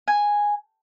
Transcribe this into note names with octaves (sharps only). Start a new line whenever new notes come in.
G#5